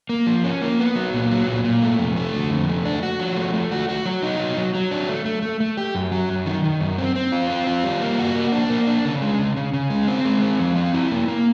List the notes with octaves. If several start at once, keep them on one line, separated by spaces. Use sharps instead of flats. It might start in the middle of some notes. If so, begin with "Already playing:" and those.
A#3
F3
C#4
A#3
B3
F#3
A#2
F#3
A#2
A#2
A3
F2
A3
D3
F2
A3
D4
F#4
F3
A3
A3
F#4
F#4
F#3
D#4
F#3
F#3
F#3
D4
A3
A3
A3
A3
G4
F#2
F#3
F#2
D#3
D#3
F#2
C4
C4
F4
C4
F4
G3
A#3
F#4
A#3
D4
A#3
D4
C#3
G#3
C#3
C#3
C#3
G#3
C4
G#3
C4
F3
C4
E4
A#3
A#3